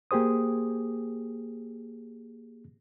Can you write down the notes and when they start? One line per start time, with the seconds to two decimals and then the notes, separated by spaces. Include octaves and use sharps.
0.11 A#3 G4 G#4 C5 D#6